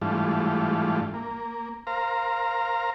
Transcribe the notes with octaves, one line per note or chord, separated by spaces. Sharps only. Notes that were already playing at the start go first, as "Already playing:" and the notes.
G#2 E3 G3 A3 D4 F4
A#3
A#4 C5 F5 A#5